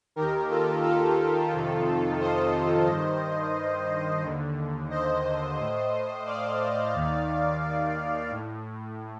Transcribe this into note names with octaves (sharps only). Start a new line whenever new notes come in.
D#2 D#3 G4 A#4
F4 A4
F4 A4
F2 C3 D#3
C5 D#5
G2 D#3
D#2 D3
C5 D#5
A2
D5 F5
D#2 D#3
A2